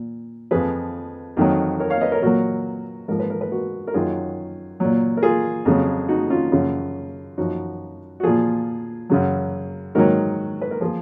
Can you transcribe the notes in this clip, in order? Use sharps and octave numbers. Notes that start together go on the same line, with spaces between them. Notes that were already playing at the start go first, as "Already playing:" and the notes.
Already playing: A#2
F2 F3 G#4 B4
F2 D#3 F#3
A#4 C#5
C#5 F5
B4 D#5
A#4 C#5
A#2 F#3 F#4 A#4
G#2 F3 A#4
B4
A#4
B4
F#4 A#4
A#4
F#2 D#3 F#3 F4 G#4
A#2 F#3
A#4
F4 G#4
F2 C#3 F#3
D#4 F#4
C#4 F4
F#2 C#3 F3
F#2 F3 D#4 F#4
F#4
A#2 F3 F4 G#4
F#2 C#3 F#3
G#2 D#3 F#3 F#4 A#4
B4
A#4
F3 F4 G#4